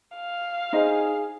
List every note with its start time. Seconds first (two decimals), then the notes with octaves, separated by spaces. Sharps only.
0.17 F5
0.73 D#4 G#4 C5 D#5